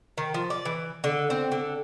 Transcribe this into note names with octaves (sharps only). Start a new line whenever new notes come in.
D#3
F3
D5
E3
D3
C4
D3